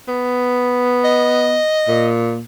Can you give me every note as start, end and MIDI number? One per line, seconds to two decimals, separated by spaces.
0.08 1.61 59
1.05 2.07 75
1.88 2.42 46